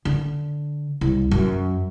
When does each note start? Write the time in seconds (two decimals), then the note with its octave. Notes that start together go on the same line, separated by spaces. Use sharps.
0.05 D3
1.01 C2
1.31 F#2